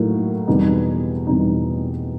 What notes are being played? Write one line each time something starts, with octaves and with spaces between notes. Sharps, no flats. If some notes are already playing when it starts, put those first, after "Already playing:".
Already playing: A2 F#3 A#3 D#4
E2 B2 G3 C4 D#4
E2 B2 G3 C4 D#4